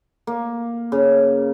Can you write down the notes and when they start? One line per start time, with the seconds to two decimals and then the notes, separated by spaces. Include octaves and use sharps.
0.27 A#3
0.92 C#3